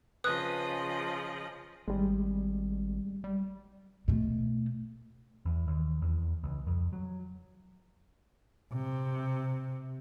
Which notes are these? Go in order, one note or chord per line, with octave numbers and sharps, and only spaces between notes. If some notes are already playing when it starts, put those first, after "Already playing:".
C#3 F3 B4 D#5 D#6 F#6
G#1 G3 G#3
G3
B2 A3
E2
D#2
E2
C#2
F2
F#3
C3